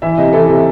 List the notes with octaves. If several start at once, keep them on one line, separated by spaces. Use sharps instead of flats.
E3 E5
C3 D#5
E3 A4
C3